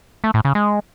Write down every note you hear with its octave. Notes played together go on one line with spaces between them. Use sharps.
A3
A2
C#3
G#3